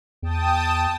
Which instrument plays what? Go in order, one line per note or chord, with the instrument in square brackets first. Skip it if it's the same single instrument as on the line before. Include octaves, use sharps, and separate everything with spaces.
[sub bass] E2 [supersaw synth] G5 A5 D#6